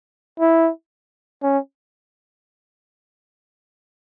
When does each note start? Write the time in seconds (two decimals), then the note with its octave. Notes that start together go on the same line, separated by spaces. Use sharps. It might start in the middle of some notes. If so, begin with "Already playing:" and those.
0.40 E4
1.43 C#4